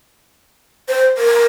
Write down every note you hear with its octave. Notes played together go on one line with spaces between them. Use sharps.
C5
A#4